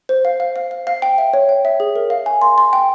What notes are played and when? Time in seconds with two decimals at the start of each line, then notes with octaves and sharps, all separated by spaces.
0.09 C5
0.25 F5
0.40 F5
0.56 F5
0.71 F5
0.87 F5
1.02 G5
1.18 E5
1.33 C#5
1.49 G5
1.65 E5
1.80 G#4
1.96 A#4
2.10 F5
2.26 G#5
2.41 C6
2.58 C6
2.73 G5